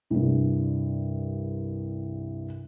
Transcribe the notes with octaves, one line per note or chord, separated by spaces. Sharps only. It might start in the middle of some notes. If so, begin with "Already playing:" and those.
C2 G2